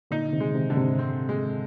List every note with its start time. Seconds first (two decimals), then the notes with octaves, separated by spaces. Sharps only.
0.11 A#2 D3 D#4
0.33 C3 D#3
0.40 G#3
0.55 C3 D#3
0.70 D3
0.77 G#2 C3
0.99 C4
1.29 G#3